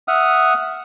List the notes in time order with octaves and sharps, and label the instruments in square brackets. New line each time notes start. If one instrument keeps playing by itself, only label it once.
[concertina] E5 F#5 D#6 F6